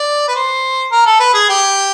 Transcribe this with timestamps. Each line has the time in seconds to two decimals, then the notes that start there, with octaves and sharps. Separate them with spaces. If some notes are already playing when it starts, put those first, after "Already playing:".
Already playing: D5
0.28 B4
0.35 C5
0.92 A#4
1.06 A4
1.20 B4
1.34 G#4
1.50 G4